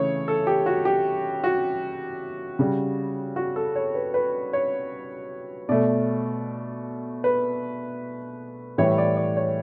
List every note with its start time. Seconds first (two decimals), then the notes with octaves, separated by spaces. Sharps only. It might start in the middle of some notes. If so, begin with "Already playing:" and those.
Already playing: C#3 E3 A3 C#5
0.28 A4
0.47 G4
0.66 F#4
0.85 G4
1.44 F#4
2.59 C#3 G3
3.36 F#4
3.56 A4
3.76 C#5
3.95 B4
4.14 B4
4.53 C#5
5.69 B2 A3 D5
7.24 B4
8.78 A2 E3 G3 C#5
8.98 D5
9.17 D5
9.37 C#5